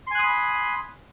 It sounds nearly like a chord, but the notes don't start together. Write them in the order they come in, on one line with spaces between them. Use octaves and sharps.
C6 G#5 F#6 D#6 B5